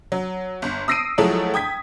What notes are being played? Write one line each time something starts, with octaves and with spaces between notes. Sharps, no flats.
F#3
G1
D#6 E6 A#6 C7 D7 D#7
F3 F#3 G#3 A3 E4 F#4
G5 D#6 G#6 B6